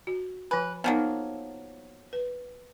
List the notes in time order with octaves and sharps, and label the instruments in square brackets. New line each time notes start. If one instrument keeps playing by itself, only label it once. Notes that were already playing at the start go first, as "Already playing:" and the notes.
[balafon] F#4
[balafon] F3 G#5 [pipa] B4
[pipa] F3 F#3 A#3 [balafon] B3 D#4
[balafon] B4